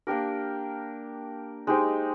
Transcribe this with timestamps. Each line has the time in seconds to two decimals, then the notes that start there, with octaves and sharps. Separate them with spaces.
0.07 A#3 D4 G4 A#4
1.67 G#3 D#4 G4 C5